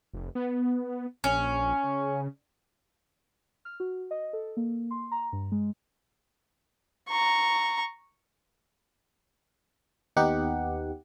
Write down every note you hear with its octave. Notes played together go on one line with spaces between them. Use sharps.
F1
B3
A#1 C#4
C#3
F6
F#4
D#5
A4
A#3
C6
A#5
G2
G#3
A#5 C#6
D#2 B3 D#4 G4 F#5